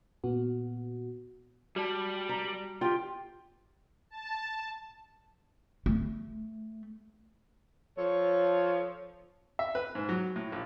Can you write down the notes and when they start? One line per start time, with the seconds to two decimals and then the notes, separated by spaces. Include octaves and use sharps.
0.24 A#2 B3 F#4
1.76 G3 F#4 D5 A5
2.29 A#5
2.81 F4 G4 G5
4.10 A5
5.86 A3
7.98 F3 A4 C#5
9.59 E5
9.75 B4
9.95 G#2
10.09 F#3
10.36 A2
10.52 A#1